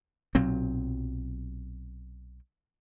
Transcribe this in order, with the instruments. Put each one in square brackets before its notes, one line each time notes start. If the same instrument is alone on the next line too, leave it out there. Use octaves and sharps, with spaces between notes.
[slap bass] B1 A#2 F#3 C4